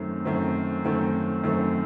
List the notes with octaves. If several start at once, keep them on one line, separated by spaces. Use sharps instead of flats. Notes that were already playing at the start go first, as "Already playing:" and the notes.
Already playing: F#2 D#3 A3 C4
F#2 D#3 A3 C4
F#2 D#3 A3 C4
F#2 D#3 A3 C4